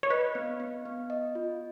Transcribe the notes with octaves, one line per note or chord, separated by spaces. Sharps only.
C#5
B4 D#5
B3
B3
B3
D#5
F4